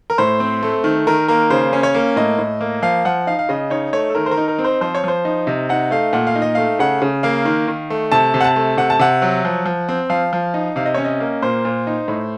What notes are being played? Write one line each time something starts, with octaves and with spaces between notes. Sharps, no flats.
A#4
A2 C5
C4
A3
D#3
D#3 A#4
A#3 A#4
C#3 C5
C#4
C#5
A#3
A2 D#5
A2
A#3
F3 F5
F3 F#5
D#4 F5
F5
C#3 D#5
D#4 C#5
A3 C#5
A4
D#3 A#4
C5
A#4
D#4
A#4
C4
C5
F3 C5
C#5
F3 C5
D#4
C3 D#5
D#4 F#5
A3 F5
A#2 F#5
F5
D#4
D#5
A3 F5
C#3 F#5
C#3
A#3 F5
D#3
D#3
A3
C3 A5
C3
F#5
A5
A3
C3 F#5
A5
C3 F#5
F#3
F3
F3
C4
F3 F5
F3
D#4
C3 F5
D#5
C#4 C#5
D#5
A#3
A#2 C5
A#2
D#4
A2